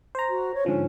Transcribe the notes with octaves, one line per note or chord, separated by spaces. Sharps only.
C5 A#5
F#4
C#5
G#2 D3 F3 C#4